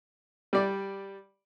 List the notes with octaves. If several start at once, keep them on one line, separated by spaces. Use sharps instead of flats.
G3 D5